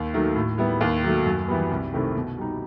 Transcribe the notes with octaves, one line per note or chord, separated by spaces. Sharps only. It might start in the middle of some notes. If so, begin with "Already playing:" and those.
Already playing: D#2
D#3 F#3 A3
A2
G3 B3 E4
D#2
D#3 F#3 A3
F#2
E3 G3 B3
C2
C3 D#3 A3 E4
B2
G3 D#4